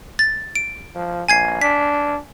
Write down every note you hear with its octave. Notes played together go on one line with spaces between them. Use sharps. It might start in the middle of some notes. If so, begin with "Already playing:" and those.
A6
D7
F3
A#1 G#5 G#6 C7
D4 B6